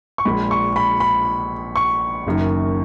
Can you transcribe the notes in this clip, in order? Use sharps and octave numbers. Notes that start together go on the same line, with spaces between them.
C#6
A#1 A#2 G#3 B5
C#6
B5
B5
C#6
F#1 F#2 D#3